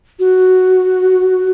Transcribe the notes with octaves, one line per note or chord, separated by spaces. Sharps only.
F#4